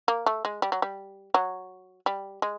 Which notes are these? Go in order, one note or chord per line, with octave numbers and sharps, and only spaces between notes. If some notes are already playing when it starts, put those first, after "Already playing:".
A#3
A3
G#3
G3
F#3
G3
F#3
G3
G#3